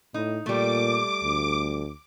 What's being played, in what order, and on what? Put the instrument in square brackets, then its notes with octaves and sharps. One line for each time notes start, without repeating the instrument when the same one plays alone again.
[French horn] A2 [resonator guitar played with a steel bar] D#4
[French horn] A#2 [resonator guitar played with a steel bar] G3 A3 [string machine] D6
[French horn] D2